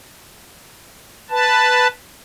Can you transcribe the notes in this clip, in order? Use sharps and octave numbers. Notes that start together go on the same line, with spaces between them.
B4 A5